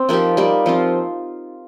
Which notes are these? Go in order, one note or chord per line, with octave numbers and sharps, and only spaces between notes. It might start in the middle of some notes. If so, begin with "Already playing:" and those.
Already playing: C4
F3 A#3 D#4 G4
G3 A#3 D#4
F3 C4 F4